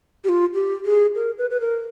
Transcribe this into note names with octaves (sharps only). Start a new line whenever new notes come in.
G4
F4
G4
G#4
A#4
B4
B4
A#4